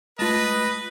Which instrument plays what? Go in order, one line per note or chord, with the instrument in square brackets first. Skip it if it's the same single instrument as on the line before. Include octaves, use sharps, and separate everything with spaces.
[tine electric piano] G#3 A3 [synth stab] F4 A5 [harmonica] B4 [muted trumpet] D#5